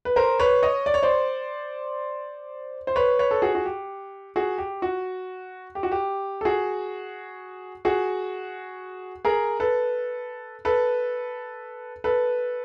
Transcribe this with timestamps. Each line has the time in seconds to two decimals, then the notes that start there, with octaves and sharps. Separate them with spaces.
0.05 B4
0.16 A#4 C5
0.39 B4 C#5
0.62 C#5 D#5
0.86 D5
0.94 C#5
1.03 C5 D5
2.87 C5
2.96 B4 C#5
3.19 B4 C#5
3.31 A4
3.42 F#4 G#4
3.55 F#4
3.66 G4
4.36 F#4 G#4
4.58 G4
4.82 F#4
5.75 G4
5.83 F#4
5.92 G4
6.41 A4
6.45 F#4 G#4
7.85 F#4 G#4
9.25 G#4 A#4
9.60 A4 B4
10.65 A4 B4
12.04 A4 B4